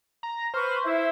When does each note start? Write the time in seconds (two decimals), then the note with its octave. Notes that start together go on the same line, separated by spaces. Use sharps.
0.23 A#5
0.54 B4 C5 C#6 F6
0.83 E4 E5